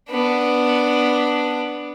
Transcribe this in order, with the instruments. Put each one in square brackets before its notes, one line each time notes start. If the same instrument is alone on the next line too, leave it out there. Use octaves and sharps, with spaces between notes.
[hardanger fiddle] B3 D4